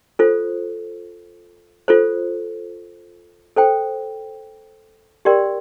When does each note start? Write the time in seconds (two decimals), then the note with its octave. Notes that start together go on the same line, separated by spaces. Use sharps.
0.19 F4 A4 C5
1.88 F4 A4 C5
3.56 A4 C5 G5
5.25 G4 A#4 D5 G5 C6